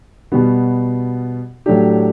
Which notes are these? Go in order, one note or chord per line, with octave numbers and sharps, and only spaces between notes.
B2 G3 B3 F#4
A2 F#3 A3 D4 G4